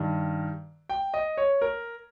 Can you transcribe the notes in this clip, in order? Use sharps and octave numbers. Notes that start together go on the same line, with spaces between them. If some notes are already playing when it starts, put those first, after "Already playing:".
Already playing: G2 D#3
G5
D#5
C#5
A#4